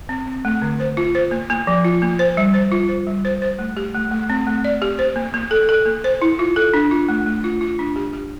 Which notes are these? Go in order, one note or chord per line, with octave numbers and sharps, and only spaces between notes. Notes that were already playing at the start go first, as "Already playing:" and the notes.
C4
C4
A3
D3
C5
F4
C5
A#3
A#3
F3
F4
A#3
C5
G3
C5
F4
C5
G3
C5
C5
A3
G4
A3
A3
C4
A3
D5
G4
C5
A#3
A#3
A4
A4
A#3
C5
E4
F4
A4
D4
F4
A3
A3
F4
F4
D4
G4
G4